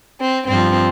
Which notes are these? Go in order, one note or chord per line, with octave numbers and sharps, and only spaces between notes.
C4
G2 F3 C4